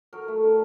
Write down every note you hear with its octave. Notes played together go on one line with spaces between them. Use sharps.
F#3 A#4
A3
D3